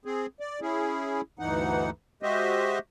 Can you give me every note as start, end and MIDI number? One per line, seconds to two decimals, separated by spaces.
0.05 0.26 60
0.05 0.26 68
0.40 0.60 74
0.61 1.21 61
0.61 1.21 64
0.61 1.21 68
1.39 1.90 38
1.39 1.90 43
1.39 1.90 52
1.39 1.90 63
1.39 1.90 78
2.23 2.79 56
2.23 2.79 66
2.23 2.79 67
2.23 2.79 72
2.23 2.79 75
2.23 2.79 76